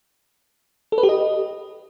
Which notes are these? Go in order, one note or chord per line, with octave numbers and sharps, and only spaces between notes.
A4
B4
G4
D#5